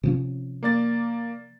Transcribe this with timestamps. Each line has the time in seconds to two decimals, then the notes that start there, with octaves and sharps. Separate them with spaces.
0.03 C3 F3 C#4
0.63 A#3 D5 A6